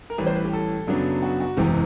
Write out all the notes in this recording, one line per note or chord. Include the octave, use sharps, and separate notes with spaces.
A#4
A1 A2 E3 G3 B4
C5
B4
G4
A4
F#2 C#3 F#3 B3 D4
F#4
F#4
F#1 E2 C3 E3 G#3 G4